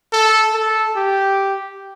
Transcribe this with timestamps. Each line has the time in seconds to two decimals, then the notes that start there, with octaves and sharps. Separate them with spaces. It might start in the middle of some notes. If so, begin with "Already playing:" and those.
0.13 A4
0.54 A4
0.96 G4